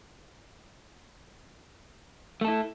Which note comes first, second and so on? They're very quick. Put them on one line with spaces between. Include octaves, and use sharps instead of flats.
A3 A4 E4